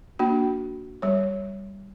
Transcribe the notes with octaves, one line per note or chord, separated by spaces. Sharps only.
A#3 D4 F#4
G3 C#5